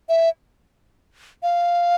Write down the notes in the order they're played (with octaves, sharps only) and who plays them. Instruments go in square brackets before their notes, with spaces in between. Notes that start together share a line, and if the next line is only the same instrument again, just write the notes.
[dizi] E5
F5